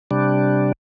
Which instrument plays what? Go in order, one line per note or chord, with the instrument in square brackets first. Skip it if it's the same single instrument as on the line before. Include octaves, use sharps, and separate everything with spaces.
[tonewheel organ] C3 G3 D4